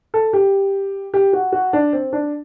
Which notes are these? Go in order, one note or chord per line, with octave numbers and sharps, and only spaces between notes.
A4
G4
G4
F#4
F#4
D4
C4
D4